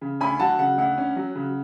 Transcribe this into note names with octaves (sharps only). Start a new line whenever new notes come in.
C#3
D2 G#5 B5
F#3 F#5 A5
C#3 F#5
D2 F#5
C#4
F#3
C#3